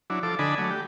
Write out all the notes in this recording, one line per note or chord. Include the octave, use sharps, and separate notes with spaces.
F#3 D4 E4
F3 A4 D6
D3 D4 D#5 G#5 A5 B5
F#3 A3
G4